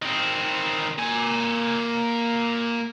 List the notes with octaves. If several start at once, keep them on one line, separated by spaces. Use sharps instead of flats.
D#3 C4
A#3 G#5